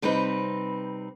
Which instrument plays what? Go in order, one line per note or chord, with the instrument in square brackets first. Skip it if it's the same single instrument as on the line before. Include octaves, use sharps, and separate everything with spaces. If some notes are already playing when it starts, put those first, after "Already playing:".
[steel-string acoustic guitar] C3 G3 C4 D#4 B4